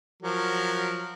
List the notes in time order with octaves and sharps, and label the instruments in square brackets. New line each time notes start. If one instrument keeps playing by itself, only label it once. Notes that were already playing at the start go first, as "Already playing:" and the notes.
[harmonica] F3 F#3 A#4